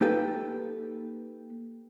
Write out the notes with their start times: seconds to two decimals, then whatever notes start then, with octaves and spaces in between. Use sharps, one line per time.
0.01 A#3 D#4 G4 A4 B4